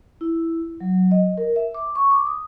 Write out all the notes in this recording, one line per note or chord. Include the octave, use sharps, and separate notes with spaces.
E4
F#3
D#5
A#4
E5
D6
C#6
D6
D#6